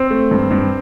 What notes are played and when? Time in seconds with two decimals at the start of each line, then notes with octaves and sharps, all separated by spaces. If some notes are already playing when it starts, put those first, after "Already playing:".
Already playing: C4
0.10 A3
0.31 G2
0.51 G2